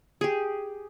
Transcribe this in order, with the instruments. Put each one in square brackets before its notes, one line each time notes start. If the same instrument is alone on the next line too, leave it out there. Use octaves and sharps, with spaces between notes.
[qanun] G4 G#4